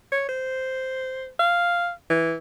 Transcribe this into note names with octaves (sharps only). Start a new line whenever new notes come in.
C#5
C5
F5
E3